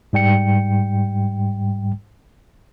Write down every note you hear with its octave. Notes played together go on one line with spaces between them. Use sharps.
G#2 G3 G5 C#7